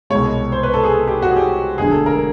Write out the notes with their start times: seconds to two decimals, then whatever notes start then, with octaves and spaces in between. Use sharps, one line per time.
0.10 C2 B2 G#3 C#5
0.52 C5
0.63 B4
0.74 A4
0.84 G#4
0.94 A4
1.07 G4
1.22 F#4
1.31 G#4
1.37 G4
1.78 E1 D2 D3 F#3 G#4
1.91 A4
2.06 A#4